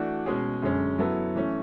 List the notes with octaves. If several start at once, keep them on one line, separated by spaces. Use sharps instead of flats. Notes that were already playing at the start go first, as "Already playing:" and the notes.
Already playing: E3 A3 D4 F#4
B2 G#3 C#4 G#4
F#2 D3 G#3 C#4
F#3 B3 E4 A4
E3 A3 C#4